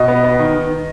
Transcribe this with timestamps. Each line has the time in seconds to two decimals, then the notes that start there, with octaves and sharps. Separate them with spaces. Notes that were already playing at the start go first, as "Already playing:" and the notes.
Already playing: B2 D#5
0.08 B3
0.24 B3
0.39 D#3
0.55 D#3